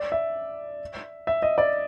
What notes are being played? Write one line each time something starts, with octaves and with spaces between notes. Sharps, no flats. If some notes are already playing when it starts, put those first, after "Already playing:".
Already playing: D5
E5
E5
D#5
D5